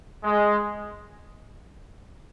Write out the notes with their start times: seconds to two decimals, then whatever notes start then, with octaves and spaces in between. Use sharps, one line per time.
0.24 G#3